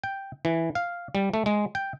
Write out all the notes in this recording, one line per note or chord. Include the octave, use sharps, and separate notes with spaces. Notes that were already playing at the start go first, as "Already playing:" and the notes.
G5
E3
F5
G3
A3
G#3
G5